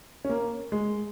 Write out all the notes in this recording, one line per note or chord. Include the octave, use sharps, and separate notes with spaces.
C#4
A#3
G#3